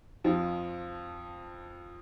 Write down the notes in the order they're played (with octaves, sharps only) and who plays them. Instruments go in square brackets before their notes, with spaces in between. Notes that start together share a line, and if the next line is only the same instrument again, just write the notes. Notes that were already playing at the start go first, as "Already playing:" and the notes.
[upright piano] F2 F3